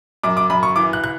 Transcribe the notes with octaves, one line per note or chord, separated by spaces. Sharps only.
F#2 D6
D6
F#2 B5
C#6
E3 D6
F#6
F#6